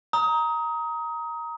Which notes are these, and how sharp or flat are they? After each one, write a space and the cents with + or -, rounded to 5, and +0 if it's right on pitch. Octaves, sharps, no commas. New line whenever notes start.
A#5 +0 D#6 +25